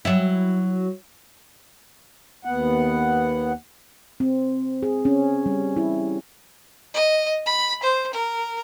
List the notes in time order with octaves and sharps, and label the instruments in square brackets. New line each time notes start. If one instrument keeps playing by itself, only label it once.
[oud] F#3 E4
[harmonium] D#2 B3 F#5
[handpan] C4
G#4
C#4
G3
E4
[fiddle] D#5
B5
C5
A#4